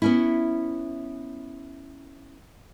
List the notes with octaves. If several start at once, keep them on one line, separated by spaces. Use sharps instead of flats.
B3 C#4 E4